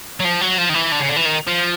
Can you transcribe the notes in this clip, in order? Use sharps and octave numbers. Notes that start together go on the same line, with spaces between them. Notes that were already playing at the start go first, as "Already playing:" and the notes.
F#3
F3
F#3
F3
D#3
E3
D3
C#3
D3
E3
D#3
F3